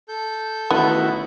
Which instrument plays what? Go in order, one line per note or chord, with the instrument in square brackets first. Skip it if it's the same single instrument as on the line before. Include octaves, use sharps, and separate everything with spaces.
[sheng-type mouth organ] A4 G6
[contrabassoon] A1 [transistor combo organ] D#3 E4 F#4 [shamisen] B3